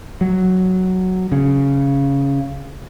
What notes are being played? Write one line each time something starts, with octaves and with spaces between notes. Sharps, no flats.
F#3
C#3